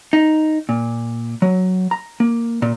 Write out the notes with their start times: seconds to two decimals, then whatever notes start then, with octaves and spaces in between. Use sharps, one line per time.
0.13 D#4
0.69 A#2
1.42 F#3
1.91 A#5
2.20 A#3
2.62 A#2